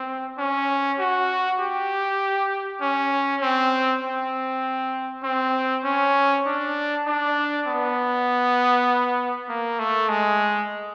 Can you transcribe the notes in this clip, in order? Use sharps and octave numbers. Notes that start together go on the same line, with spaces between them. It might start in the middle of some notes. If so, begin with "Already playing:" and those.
Already playing: C4
C#4
F#4
G4
C#4
C4
C4
C4
C#4
D4
D4
B3
A#3
A3
G#3